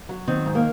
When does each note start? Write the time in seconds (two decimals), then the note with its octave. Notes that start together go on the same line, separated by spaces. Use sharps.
0.09 F#3
0.27 D#3 C4
0.46 G#2
0.55 A#3